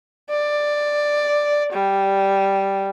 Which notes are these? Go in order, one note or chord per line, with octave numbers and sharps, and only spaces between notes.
D5
G3